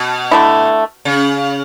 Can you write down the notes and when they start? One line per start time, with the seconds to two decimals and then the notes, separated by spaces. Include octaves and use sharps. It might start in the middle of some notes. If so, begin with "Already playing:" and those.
Already playing: B2
0.31 D3 A3 E4
1.05 C#3